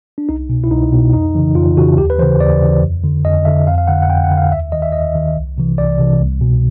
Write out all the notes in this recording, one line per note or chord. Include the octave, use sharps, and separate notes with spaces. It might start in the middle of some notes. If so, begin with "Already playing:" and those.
D4
C2 D#4
B2
E4
C2 D#4
B2
F2 D#4
C#3 E3
F2 F4
C#3 E3 F#4
D#2 G4
B4
C#3 E3 C5
D#2 D5
C#3 E3
F2
D3
F2 D#5
D3 E5
F2 F5
F5
D3 F#5
F#5
F2 G5
F#5
D3
F5
D#2 E5
D#3 D#5
E5
D#2 D#5
D#3
C2
C3 E3
C2 D5
C3 E3
C2
B2